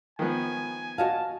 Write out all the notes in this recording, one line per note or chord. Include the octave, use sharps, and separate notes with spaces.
D#3 F3 B3 G#5
F#4 D#5 F5 A5